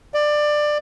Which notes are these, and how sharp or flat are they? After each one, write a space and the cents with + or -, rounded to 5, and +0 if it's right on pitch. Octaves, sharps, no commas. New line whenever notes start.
D5 +20